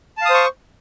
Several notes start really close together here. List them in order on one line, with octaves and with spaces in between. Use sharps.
A5 F5 D#6 C5 C#6